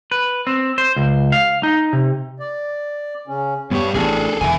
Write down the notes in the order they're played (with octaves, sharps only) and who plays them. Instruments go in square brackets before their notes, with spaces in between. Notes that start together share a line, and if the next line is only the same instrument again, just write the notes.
[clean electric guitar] B4
C4
C5
C#2
F5
D#4
C3
[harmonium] D5
C#3 C#4
[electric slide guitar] G2 G4 [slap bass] B3 [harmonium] C#5
[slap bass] A1 [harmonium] D4 [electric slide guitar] G#4 A4
[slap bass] E1 D#3 [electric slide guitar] E5 G#5